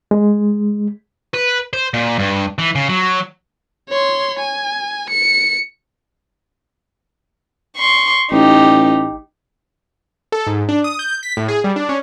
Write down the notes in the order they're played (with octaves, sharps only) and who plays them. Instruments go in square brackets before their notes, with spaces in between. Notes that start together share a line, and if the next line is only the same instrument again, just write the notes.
[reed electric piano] G#3
[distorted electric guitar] B4
C5
A#2
G2
E3
C#3
F#3
[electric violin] C#5 C6
G#5
C#7
[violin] C6 C#6
[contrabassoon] A1 [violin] D#4 G4
[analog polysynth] A4
G#2
D4
D#6
G6
B6
A2
G#4
G3
D4
C#4